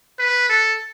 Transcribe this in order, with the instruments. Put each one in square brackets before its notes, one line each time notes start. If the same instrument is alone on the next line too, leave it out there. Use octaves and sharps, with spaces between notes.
[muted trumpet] B4
A4